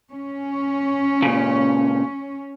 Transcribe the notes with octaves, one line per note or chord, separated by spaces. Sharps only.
C#4
A#2 C#3